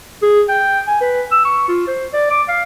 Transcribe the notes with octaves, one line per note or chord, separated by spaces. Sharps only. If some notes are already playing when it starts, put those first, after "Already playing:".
G#4
G5
G#5
B4
E6
C#6
F4
C5
D5
D6
F5